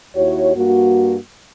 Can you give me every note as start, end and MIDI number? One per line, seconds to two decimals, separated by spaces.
0.16 0.55 39
0.16 0.55 64
0.16 0.55 66
0.16 0.55 73
0.56 1.17 43
0.56 1.17 58
0.56 1.17 66